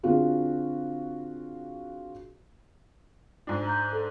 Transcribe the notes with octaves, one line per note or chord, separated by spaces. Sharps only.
D3 C4 F4 F#4 G#4
G#2 D4
A#5 G6
A4